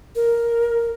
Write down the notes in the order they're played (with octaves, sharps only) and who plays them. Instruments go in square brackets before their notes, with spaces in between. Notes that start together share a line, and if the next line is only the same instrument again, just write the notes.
[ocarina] A#4